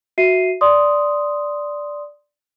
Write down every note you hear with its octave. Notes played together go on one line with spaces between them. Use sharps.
F#4 E5 C7 D#7
D5 C6 D#6